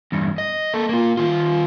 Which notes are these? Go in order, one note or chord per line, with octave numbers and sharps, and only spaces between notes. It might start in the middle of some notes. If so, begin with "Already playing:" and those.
E2 G2
D#5
A#3 A4
A#3 F4
D#3 F4